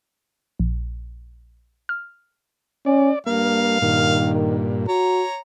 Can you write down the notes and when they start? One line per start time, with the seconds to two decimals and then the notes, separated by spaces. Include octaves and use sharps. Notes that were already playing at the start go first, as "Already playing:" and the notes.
0.59 A#1
1.89 F6
2.86 C#4 D5
3.26 G2 A#3 F5
3.82 G2 A#2 D#3
4.88 F#4 C#5 A#5